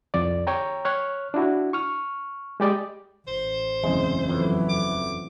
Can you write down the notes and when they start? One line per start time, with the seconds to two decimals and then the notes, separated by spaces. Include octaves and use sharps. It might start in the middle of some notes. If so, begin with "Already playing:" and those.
0.14 C2 F2 D5
0.47 C#5 G5 A#5
0.85 C#5 F6 F#6
1.34 D4 E4 F#4
1.73 C#6 F6
2.60 G#3 G4 D5 D#5
3.28 A1 C5
3.83 F#1 E2 C3 G#3
4.28 F2 A2 E3 F#3
4.69 D6